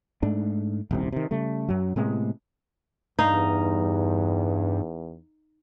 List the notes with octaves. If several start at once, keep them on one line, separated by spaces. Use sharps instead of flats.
G#2 A3 D4
D#1 C2 C3
C3 D#3
C#3 G3 A3
F#2 F#3
A2 C3 G#3 B3
E2 G2 D#4 F5